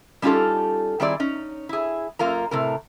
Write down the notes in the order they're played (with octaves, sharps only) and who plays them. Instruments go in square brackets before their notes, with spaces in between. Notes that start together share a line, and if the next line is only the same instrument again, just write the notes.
[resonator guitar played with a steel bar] G3 C#4 D#4 F4 G4 A4
D#3 G3 C4 E4 G#4 D5
C#4 D#4
E4 G#4
F#2 A#3 F4 A#4 A#5
A2 C3 A#4